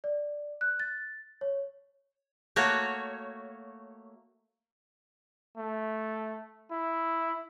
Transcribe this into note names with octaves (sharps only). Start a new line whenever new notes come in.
D5
F#6
A6
C#5
A3 A#3 F#4 C#5
A3
E4